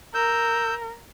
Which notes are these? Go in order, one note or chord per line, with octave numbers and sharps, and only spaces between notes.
A#4 E6 G6